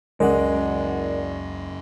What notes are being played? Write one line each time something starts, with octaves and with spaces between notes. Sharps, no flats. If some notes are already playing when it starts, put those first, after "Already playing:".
F#1 C#2 F#2 G#3 C#4 A#4 D5 F#5